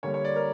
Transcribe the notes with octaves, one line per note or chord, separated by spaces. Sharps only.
D3 G3 A#3 C#5
C#5
D5
A#4